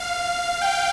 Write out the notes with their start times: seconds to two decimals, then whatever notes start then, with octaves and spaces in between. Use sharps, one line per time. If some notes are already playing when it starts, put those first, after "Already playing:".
Already playing: F5
0.61 G5